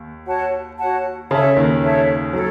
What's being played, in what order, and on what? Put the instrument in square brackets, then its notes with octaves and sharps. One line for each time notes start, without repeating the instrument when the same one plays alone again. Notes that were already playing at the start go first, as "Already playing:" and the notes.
Already playing: [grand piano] D#2
[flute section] F#4 C#5 F#5 A5
F#4 C#5 F#5 A5
[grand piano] C#3 [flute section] A4 C#5 E5 A5
[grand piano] D#2 D#3
[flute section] A4 C#5 E5 A5
[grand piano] F#3 [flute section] A4 C#5